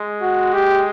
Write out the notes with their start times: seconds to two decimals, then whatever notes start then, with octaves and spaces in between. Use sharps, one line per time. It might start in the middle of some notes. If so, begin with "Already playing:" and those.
Already playing: G#3
0.22 F#4
0.53 G4